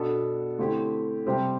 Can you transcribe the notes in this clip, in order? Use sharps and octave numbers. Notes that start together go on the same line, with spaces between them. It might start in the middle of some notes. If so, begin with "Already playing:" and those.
Already playing: B2 B3 D4 A4 D5
D3 A3 C4 E4 G4
C3 G3 C4 G4 C5